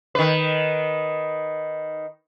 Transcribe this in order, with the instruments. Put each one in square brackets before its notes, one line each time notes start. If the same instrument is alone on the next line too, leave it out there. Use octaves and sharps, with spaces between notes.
[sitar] D#3 B4